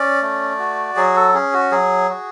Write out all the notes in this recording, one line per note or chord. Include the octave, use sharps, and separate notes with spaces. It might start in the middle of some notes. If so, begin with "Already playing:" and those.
Already playing: C#4 D5
A3
F#4
F#3 G#4
A4
C#4 G#4
F#4
F#3 G#4
F#4